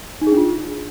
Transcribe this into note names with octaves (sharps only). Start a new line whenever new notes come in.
D#4
G#4
D4
F4